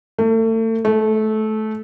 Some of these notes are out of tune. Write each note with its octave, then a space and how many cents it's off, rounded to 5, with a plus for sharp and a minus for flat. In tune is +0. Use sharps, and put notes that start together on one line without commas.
A3 +35
A3 -20